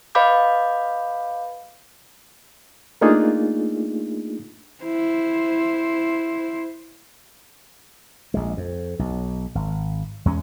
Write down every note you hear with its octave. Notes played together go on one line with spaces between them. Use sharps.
B4 D#5 F5 B5 D6 G6
A3 A#3 D4 D#4 F4 G#4
E4 C5
A#1 G#3
F2
B1
G#1
E2 G#3 C#4